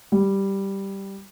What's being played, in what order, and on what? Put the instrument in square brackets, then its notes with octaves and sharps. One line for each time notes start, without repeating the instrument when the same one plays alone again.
[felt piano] G3